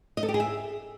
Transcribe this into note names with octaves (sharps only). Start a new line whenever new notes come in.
D#5
A4
G4
G#4
E5